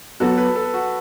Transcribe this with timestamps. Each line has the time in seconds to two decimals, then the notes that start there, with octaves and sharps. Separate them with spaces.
0.20 F#3 B3 F#4 A4
0.38 B4
0.56 A4
0.74 F#4